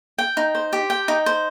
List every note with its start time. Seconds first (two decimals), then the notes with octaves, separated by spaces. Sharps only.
0.18 G5
0.37 D#4
0.55 C5
0.73 G4
0.90 G5
1.08 D#4
1.26 C5